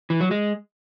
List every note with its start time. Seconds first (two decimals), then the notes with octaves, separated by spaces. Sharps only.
0.10 E3
0.21 F#3
0.31 G#3